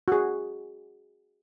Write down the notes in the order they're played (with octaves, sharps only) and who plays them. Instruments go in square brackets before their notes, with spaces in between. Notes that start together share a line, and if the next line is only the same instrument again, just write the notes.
[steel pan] F#4 G#4